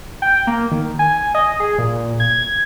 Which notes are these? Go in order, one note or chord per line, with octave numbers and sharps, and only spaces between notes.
G5
A#3
D#3
G#5
D#5
G#4
A#2
G#6